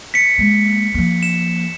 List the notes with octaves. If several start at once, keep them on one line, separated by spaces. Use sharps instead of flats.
B6 C#7
G#3 A#3
F3 A#3
E7